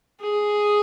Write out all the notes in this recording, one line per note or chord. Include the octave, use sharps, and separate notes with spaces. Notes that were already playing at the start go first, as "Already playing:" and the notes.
G#4